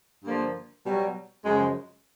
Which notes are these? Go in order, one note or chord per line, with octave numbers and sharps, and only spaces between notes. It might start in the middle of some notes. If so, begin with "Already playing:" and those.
G2 D3 F3 A#3
B2 F#3 G3
F#2 C#3 F3 G#3